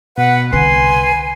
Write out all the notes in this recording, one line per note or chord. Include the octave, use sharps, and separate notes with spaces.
B2 B4 F#5
C2 D3 B4 G#5 C6